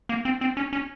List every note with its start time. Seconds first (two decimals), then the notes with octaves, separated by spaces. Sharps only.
0.09 A#3
0.25 C4
0.41 C4
0.57 C#4
0.73 C#4